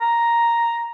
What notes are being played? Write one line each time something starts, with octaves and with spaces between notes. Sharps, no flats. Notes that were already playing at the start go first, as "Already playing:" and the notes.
A#5